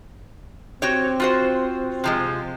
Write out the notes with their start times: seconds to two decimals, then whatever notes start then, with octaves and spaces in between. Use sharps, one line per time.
0.82 C4 F#4 G4 C#5
1.20 F4 F#4 C5
2.04 C3 F3 G#3